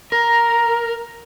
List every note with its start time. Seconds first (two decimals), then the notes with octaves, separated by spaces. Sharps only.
0.12 A#4 A#5